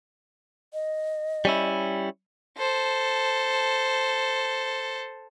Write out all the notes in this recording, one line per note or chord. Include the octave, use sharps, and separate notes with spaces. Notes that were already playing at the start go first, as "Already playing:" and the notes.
D#5
G3 C#4 E4
A4 C5